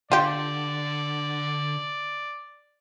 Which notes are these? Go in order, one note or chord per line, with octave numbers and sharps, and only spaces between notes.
D3 F4 G4 D5